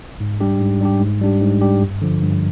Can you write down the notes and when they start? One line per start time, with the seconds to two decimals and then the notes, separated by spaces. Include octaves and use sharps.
0.20 G#2
0.40 G3 D4 G4
0.61 G#2
0.81 G3 D4 G4
1.00 G#2
1.21 G3 D4 G4
1.41 G#2
1.61 G3 D4 G4
1.82 G2
2.02 D3 F3
2.22 G2